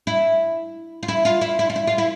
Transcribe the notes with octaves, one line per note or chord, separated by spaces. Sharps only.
E4
F4
E4
F4
E4
E4
F4
E4
F4
E4